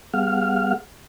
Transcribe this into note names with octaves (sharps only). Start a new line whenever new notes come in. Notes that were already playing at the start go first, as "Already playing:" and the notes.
G3 B3 G#4 F5 F#5 F6